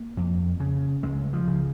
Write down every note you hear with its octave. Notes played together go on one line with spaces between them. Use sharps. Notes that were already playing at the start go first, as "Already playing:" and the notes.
Already playing: A#3
F2
C#3
C#2 G#3
F3
C#3